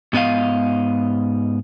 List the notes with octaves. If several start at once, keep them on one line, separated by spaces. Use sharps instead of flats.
G#2 B3 D#5 F5